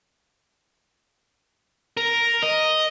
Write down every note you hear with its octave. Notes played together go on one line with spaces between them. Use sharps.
A#4
D#5